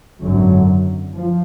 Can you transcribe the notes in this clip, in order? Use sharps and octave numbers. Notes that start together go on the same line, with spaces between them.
G#1 F#2 D3 F#3
F3